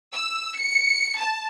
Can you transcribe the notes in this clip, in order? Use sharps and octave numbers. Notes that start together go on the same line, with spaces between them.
E6
C#7
A5